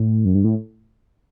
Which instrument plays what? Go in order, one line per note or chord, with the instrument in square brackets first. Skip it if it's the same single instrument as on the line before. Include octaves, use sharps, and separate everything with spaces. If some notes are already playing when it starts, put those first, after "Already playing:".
Already playing: [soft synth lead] A2
F#2
G2
A2